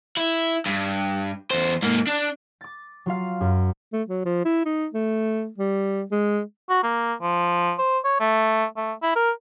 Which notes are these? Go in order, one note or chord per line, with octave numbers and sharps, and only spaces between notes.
E4
G2
E2 C5
G#2 A#3
D4
D6 A6
F#3 F4 F5
F#2
A3
F#3
F3
E4
D#4
A3
G3
G#3
F#4
A#3
F3
C5
C#5
A3
A3
E4
A#4